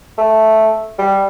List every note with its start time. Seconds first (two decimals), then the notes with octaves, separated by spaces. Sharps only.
0.18 A3
0.98 G3